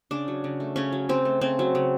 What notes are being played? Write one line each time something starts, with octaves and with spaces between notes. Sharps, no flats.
C#3 D4
F#3
C#3
A3
C#3 C#4
F#3
C#3 C4
A3
C#3 C4
F#3
C#3